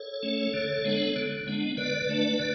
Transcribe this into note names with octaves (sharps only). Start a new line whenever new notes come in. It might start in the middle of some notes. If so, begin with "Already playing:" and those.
Already playing: A4 C#5
A3 C#4
D3
G#3 B3 D4
D3
G#3 B3 D4
D3 B4 D5
A3 D4
D3